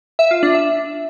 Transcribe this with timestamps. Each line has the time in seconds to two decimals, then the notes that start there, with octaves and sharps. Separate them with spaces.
0.19 E5
0.31 F4
0.43 D4
0.55 E5